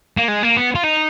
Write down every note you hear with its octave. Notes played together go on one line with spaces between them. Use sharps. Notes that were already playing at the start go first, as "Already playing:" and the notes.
A#3
G#3
A#3
B3
F4
D#4